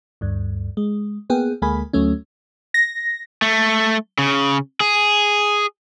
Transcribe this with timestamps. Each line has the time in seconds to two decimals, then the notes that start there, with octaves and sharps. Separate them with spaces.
0.21 D2 G2
0.77 G#3
1.30 A#3 B3 G#4 G5
1.62 D2 G#3 A#3 G#5 B5
1.93 D2 F#3 A3 C#4
2.74 A#6
3.42 A3
4.18 C#3
4.80 G#4